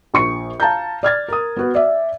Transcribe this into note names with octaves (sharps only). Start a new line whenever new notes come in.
A#1 C#6 C#7
F5 A5 A#5 G6
D5 F6 G#6 A6
A#4 D#6
B3 F#4 B4
D5 E5